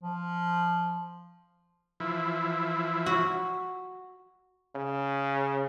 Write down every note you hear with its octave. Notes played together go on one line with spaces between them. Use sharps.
F3
E3 F3 E4
F#4
C#3